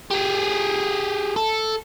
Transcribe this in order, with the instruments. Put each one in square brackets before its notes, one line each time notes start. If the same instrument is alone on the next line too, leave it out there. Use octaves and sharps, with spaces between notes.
[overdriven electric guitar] G4 G#4
A4